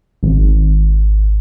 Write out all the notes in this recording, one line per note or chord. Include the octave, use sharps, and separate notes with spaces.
G#1